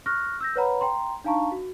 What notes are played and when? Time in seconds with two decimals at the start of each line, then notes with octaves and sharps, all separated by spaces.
0.06 C#6 F6 F#6 A#6
0.41 E6 G6 A#6
0.56 B4 C#5 F#5 A#5 B5
0.81 G5 A#5 C6
1.24 D4 D#4 F5 A5 A#5 C#6
1.52 F#4